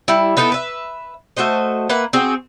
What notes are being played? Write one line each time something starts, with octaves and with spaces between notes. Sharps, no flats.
G3 E4
B3 D#4 E4 A4
B4 E5
A3 F#4 C5 D#5
A#3 B4 E5 F#5
C4 F#4 G#4